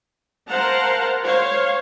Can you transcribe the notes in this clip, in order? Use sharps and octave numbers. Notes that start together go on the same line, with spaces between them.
A#4 C5 F5 F#5 A5 A#5
C5 C#5 F5